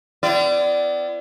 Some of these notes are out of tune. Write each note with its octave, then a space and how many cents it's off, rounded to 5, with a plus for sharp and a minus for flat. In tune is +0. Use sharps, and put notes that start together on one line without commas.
B3 +45 E4 +45 D5 +0